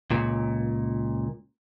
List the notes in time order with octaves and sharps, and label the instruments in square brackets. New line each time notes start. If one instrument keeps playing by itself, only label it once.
[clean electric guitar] C#2 A#2